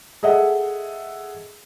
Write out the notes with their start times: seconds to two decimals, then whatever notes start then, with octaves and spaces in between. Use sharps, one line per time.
0.23 G#4 A4 D#5 E5 F#5